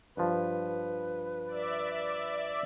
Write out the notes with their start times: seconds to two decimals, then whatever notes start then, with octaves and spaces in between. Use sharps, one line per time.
0.17 G2 F3 B4
1.48 D5 E5